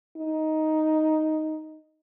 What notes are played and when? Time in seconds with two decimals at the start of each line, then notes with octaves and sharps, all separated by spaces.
0.17 D#4